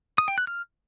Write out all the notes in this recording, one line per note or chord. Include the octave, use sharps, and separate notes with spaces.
D#6
G5
F#6
F6